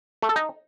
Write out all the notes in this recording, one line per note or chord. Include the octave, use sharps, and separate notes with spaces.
A3
A4
D#4